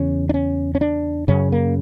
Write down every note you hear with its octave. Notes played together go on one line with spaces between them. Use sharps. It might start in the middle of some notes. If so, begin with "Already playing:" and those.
Already playing: E2 C#3 C#4
D4
C#4
C#4
D4
F#2 C#3 C#4
A#3